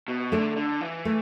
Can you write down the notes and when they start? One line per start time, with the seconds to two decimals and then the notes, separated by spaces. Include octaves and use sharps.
0.08 B2
0.32 D3 A3 D4 A4 D5
0.56 D3
0.81 E3
1.05 A3